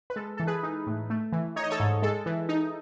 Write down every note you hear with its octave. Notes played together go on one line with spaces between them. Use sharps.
B4
G#3 A4
E3 A4
G#4 B4
D#4
A2
A3
E3
D#4 C#5
D#5
A4 C#5
G#2
G#3 A4
E3
D#4